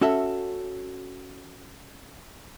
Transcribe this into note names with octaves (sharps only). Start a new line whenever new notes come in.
C#4 F#4 A4 E5